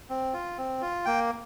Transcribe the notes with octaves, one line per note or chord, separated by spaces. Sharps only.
C4
F4
C4
F4
A#3 G5